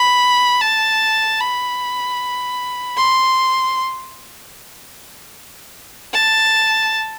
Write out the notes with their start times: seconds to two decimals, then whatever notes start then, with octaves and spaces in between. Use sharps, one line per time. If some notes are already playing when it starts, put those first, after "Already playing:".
Already playing: B5
0.61 A5
1.41 B5
2.97 C6
6.13 A5